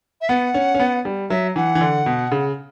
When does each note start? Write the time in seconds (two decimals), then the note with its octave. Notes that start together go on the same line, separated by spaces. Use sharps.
0.21 E5
0.29 B3 F#5
0.54 C#4
0.75 C#4
0.80 B3
1.05 G3
1.30 F#3 E5
1.56 E3 F#5
1.75 E3
1.81 D3
2.06 B2
2.32 C#3